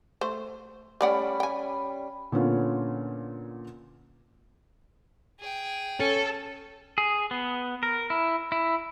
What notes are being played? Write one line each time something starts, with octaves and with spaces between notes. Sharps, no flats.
A3 C5
G3 A3 C#4 D5 F#5 B5
G5 G#5
A#2 D3 B3 C#4 F4
G#4 G5
C#4 A4
G#4
B3
A#4
E4
E4